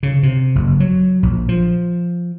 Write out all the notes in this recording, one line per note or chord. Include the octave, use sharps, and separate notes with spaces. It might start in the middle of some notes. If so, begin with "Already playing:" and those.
C#3
C3
F#1
F#3
A#1
F3